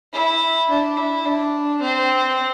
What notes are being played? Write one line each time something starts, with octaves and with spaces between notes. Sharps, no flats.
E4
D4
E4
D4
C4